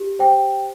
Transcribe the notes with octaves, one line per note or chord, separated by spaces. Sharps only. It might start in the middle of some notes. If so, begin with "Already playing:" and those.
Already playing: G4
C5 G5